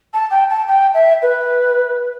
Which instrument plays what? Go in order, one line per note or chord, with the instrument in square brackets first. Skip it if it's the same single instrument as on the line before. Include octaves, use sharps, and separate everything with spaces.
[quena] A5
G5
A5
G5
E5
B4